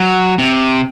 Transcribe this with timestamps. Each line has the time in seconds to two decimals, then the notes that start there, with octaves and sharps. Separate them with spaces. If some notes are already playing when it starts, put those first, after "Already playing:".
Already playing: F#3
0.38 C3